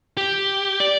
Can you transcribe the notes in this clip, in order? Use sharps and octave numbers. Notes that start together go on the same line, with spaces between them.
G4
D5